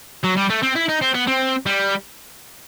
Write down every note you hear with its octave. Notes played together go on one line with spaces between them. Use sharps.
F#3
G3
A3
C4
E4
D#4
C4
B3
C4
G3